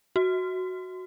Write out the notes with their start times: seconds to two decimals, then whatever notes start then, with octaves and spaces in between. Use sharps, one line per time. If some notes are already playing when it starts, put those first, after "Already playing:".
0.16 F#4